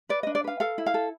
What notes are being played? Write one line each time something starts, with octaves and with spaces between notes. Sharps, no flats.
B4 D5
D4 D#5
D5
B4 F5
A4 F5
E4
F5
A4